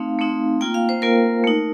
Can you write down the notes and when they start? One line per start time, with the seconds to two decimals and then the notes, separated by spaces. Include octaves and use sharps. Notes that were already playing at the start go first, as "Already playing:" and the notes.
Already playing: A3 C4 D#4 F5
0.19 A3 C4 D#4
0.61 A#3 F4 G5
0.74 F5
0.89 C5
1.02 A#3 F4 A#4
1.44 A3 D#4